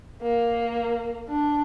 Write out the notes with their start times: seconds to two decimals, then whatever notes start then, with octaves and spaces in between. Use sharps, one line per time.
0.22 A#3
1.29 D4